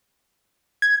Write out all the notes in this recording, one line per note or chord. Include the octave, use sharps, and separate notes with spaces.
G#6